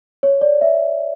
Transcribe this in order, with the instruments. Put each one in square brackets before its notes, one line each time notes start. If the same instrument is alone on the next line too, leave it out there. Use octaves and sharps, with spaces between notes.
[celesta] C#5
D5
E5